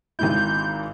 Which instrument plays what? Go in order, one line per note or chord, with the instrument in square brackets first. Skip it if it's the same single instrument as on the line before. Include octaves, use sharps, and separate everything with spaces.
[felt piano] G#1 G#2 E4 [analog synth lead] G6